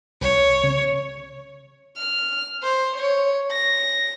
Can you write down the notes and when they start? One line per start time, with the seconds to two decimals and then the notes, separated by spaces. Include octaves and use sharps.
0.21 C2 C#5
0.63 C#3
1.97 F6
2.63 C5
2.96 C#5
3.51 A#6